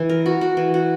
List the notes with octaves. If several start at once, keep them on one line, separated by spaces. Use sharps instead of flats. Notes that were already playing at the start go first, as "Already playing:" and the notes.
Already playing: E3
A#4
F#4
F#4
E3
F#4